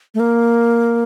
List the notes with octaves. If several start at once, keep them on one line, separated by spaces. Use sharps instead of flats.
A3
A#3